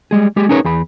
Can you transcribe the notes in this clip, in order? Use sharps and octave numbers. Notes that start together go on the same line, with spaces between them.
G3 G#3 G#4
G#3 G4 G#4
C#4 D#4 G#4 A#4 B4 C#5
E2 G#4 B5